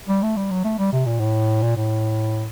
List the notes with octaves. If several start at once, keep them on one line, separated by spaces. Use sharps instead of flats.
G3
A3
G3
F#3
A3
G3
C3
A#2
A2
A#2
A2